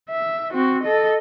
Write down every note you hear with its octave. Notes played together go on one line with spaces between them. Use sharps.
E5
C4 F#4
A4 D#5